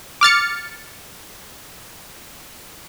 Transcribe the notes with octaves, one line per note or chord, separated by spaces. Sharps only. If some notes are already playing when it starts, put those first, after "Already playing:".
D6 F6 A6 C#7